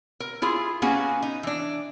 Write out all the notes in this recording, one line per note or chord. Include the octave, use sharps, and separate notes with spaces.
A#4
E4 F4 G#4
A#3 B3 C#4 F#4 G#4
D#4
E3 D4